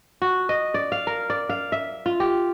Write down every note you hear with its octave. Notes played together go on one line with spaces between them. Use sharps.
F#4
D#5
D5
F5
A#4
D5
F5
E5
F4
G4